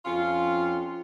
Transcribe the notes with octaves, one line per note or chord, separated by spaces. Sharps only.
F2 C#4 F4